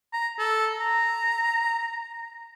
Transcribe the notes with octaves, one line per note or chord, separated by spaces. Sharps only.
A#5
A4
A#5